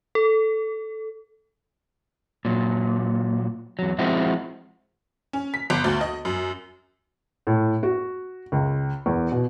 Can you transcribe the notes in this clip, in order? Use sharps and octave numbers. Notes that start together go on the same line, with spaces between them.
A4
A#2 F#3
E2 F#3
F3 G#3 C4 E4 F#4
C#4
B6
G1
D2
D#5
F#2
A2
F#4
C#2
E2
B2